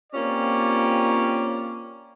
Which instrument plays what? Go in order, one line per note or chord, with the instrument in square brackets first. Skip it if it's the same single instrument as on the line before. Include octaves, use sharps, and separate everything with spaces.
[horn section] A#3 C4 C#4 F4 G4 D5